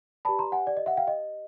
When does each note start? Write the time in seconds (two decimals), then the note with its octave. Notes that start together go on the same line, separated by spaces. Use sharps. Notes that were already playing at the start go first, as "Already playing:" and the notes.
0.25 G4 B4 D5 A5 B5
0.39 A#5 C6
0.52 F#5 G#5
0.67 D5
0.77 D#5
0.86 E5 F#5
0.97 F5 G5
1.08 D#5